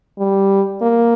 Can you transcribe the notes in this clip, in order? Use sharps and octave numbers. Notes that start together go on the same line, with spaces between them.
G3
A#3